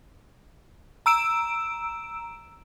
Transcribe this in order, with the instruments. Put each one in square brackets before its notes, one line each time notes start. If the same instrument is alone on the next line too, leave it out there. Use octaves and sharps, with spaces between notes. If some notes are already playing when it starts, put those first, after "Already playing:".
[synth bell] A#5 E6 D7 E7